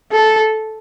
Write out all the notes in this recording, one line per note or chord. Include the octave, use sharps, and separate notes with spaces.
A4